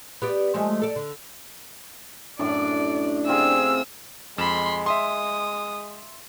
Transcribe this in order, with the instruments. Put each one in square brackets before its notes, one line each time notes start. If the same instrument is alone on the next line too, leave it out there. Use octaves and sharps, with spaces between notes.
[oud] B3 G4 D5
F3 G#3 A3
A4 D5
D3
[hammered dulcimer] F#2 A2 [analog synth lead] D4 [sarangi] D5
[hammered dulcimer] C3 F4 [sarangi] G#4 [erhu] E6
[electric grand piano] F2 E7 [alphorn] G#3 [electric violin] B5 C6
[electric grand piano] E5 C6 [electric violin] D#6